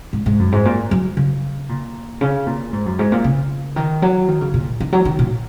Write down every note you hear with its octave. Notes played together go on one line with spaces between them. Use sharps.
G#2
G#2
F#2
G#2
A#2
F#3
C#3
A#2
C#3
A#2
G#2
F#2
G#2
A#2
C#3
D#3
F#3
D#3
C#3
A#2
D#3
F#3
D#3
A#2